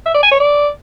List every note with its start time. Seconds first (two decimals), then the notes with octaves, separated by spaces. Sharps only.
0.06 E5
0.14 D5
0.23 G#5
0.31 C#5
0.40 D5